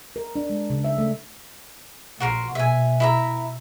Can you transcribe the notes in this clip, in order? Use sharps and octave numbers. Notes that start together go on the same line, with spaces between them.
A#4
D4
G#3
C#3
E5
A3
A#1 A#2 F#4 A#4 C6
B2 E5 G#5
E4 E5 A#5